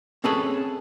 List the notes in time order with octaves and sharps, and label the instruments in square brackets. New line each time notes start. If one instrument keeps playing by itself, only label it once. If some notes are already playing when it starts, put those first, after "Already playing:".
[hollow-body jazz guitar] C4 C#4 G#4 A4 B4 C#5